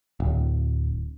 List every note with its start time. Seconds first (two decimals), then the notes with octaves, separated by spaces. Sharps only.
0.20 D1